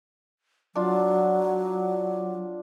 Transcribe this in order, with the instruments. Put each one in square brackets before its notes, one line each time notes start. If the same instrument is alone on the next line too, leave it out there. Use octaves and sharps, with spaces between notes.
[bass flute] F#3 [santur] D4 F4